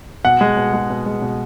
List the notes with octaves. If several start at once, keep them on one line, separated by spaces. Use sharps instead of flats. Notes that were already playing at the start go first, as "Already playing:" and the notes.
B2 F#5
G#3
B2
G#3
B2
G#3
B2